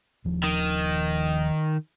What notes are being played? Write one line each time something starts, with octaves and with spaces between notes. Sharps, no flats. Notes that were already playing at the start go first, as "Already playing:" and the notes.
D#1 F3
D#3